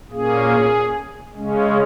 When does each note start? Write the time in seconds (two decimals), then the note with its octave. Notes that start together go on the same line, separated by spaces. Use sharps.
0.11 A#2 A#3 C#4 G#4
1.35 C#3 G#3 C#4